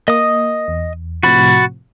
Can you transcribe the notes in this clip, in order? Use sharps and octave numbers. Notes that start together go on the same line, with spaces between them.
A#3 D#5 D#6
E2
A2 C3 F3 F#4 B5 A6